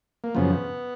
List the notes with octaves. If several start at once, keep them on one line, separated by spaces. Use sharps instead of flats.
A#3
F#2 C#3 F3 B3